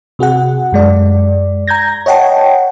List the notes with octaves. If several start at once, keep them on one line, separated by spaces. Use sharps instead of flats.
C3 F#4 G#4 F#5
F#2 G#3 D5
A#5 G6 G#6 A#6
C#5 D#5 F#5 G5 A5